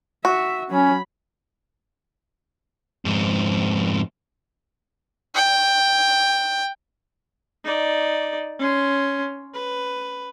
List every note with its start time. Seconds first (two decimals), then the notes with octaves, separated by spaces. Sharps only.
0.25 F#4 E5
0.70 F#3 C#4 B5
3.05 F2 G#2
5.35 G5
7.64 D#4 D5
8.59 C#4 C6
9.54 B4